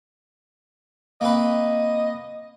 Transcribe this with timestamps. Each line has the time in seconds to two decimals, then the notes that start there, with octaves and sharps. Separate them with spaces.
1.21 A#3 C4 B4 D#5